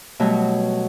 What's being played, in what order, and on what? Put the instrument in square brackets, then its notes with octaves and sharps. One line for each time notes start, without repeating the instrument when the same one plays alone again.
[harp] B2 F#3 G3 A3 B3